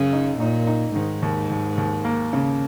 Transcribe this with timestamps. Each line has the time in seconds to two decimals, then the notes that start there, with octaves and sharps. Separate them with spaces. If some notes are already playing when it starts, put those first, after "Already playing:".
Already playing: F#2 C#3
0.13 D#4
0.40 A#2 D#4
0.67 D#4
0.95 G#2 D#3
1.22 D#2
1.50 D#2
1.77 D#2
2.05 A#3
2.33 C#3